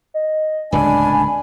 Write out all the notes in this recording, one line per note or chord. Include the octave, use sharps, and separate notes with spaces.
D#5
D1 C#2 D3 D4 G#5 B5